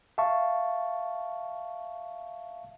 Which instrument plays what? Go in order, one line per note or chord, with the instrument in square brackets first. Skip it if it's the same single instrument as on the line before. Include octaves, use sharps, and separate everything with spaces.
[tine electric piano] E5 F5 A5 C#6